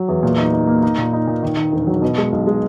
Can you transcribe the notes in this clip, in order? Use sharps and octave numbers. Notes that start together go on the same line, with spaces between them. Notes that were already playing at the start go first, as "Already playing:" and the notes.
Already playing: F#3
E2
A#2
D#4
D#4
A#3
D#4
A#2
D#4
A#2
D#3
D#3
E1
F#3
B2
G#3
B1
G#3